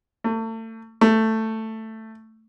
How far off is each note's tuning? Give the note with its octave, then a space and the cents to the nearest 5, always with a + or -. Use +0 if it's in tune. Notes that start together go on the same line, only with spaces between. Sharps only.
A3 +35
A3 +10